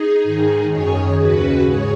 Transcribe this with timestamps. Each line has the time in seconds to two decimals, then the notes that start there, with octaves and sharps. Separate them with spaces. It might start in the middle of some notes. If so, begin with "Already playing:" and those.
Already playing: D#4 G#4
0.23 G#2 D#3
0.70 F#2 D#3 G#4 C#5
1.18 D#2 C#3 F#4 B4
1.65 G#2 G#4 C#5